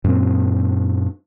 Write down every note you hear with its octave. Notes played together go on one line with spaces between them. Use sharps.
F#2 A#2 C4